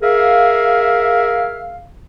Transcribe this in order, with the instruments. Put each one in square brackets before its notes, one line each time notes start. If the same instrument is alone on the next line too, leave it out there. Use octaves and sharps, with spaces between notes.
[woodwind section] G#4 A#4 E5 F5